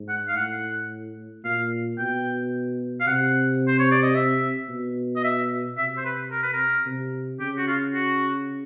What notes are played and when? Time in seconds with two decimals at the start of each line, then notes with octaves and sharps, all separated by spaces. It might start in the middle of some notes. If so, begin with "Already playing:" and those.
Already playing: G#2
0.09 F#5
0.28 F5
0.36 A2 F#5
1.44 A#2 F5
1.98 B2 G5
3.00 F5
3.07 C3 F#5
3.67 C5
3.79 C#5
3.91 D5
4.03 D#5
4.15 E5
4.69 B2
5.16 D#5
5.24 E5
5.78 C3 E5
5.97 C5
6.05 B4
6.31 A#4
6.43 B4
6.53 A#4
6.86 C3
7.40 C#3 G4
7.57 F#4
7.67 F4
7.94 F#4